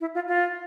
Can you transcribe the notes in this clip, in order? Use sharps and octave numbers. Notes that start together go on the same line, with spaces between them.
E4
F4
F4